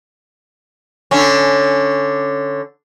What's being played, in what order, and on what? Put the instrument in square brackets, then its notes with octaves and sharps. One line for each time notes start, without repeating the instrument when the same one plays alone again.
[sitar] D3 C#4